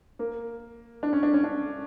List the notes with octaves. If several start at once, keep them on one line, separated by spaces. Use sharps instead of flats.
A#3
D4
C#4
D4
C#4
D4